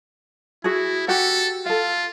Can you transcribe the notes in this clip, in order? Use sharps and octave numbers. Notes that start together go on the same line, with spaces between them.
E4 F#4 G#4
F#4 G4 A4 F#5
F4 A4 F5